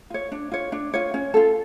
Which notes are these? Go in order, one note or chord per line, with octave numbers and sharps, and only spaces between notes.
F4 C#5
D4
F4 C#5
D4
F4 C#5
C#4
F4 A4